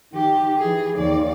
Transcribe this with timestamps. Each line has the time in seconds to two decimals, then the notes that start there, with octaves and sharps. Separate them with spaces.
0.13 D#3 G4
0.58 E3 G#4
0.96 D#2 D5